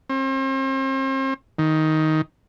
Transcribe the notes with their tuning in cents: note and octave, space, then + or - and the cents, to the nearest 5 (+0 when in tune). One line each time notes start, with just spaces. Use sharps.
C4 +40
D#3 +10